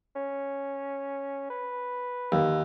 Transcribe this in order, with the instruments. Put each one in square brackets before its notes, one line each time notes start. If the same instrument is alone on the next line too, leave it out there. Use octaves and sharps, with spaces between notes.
[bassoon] C#4
B4
[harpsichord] D#2